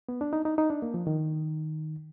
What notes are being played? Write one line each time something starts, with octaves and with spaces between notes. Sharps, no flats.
B3
D4
D#4
D#4
D#4
D4
A#3
F3
D#3